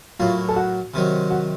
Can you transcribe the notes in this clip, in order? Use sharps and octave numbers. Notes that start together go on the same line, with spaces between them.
A2 F#3 A#3 F4
A4
F#4
C3 D#3 F#3
F#4